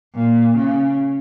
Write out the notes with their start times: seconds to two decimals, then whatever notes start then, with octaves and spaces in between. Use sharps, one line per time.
0.15 A#2
0.56 C#3